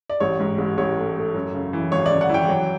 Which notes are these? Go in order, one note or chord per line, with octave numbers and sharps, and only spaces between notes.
D5
A1 C#5
G#2
A1
A1 C#5
A3
A3
F#2
C#3
E3
G#1 C#5
C#3 D5
F#5
E3 G5
F#3